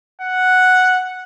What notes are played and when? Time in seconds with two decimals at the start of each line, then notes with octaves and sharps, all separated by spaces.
0.21 F#5